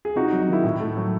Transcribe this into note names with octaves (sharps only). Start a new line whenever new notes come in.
G#4
C3 D#4 F#4
F#3
D#4
D#3 E4
A2
A3
F#3